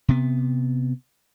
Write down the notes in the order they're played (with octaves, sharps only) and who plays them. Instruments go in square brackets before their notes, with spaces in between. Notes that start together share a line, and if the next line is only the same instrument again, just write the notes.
[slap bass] C3 B3